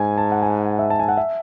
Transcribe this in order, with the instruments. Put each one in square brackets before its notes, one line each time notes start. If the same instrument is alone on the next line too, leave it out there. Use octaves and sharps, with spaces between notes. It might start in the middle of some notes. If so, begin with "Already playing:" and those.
Already playing: [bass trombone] G#2 [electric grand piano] G#5
[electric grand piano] A5
F#5
G#5
E5
A5
G#5
F#5
E5